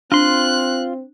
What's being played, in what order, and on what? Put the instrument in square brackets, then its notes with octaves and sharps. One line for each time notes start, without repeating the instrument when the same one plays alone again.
[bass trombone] C4 [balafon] D4 [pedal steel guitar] F4 C6 [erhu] F#6